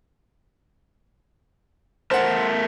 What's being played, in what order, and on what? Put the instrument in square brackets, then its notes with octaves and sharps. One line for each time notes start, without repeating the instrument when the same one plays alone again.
[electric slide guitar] A3 A#4 A5 [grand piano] C5 F#5